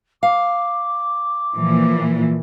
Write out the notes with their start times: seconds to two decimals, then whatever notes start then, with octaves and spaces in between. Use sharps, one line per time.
0.23 F5 D6
1.56 A#2 E3 F3